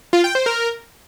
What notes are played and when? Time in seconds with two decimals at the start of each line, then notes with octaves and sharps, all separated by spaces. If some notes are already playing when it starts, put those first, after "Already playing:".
0.13 F4
0.24 G5
0.35 C5
0.46 A#4